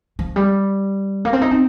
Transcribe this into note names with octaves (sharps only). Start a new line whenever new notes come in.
F3
G3
A#3
C4
D#4
C4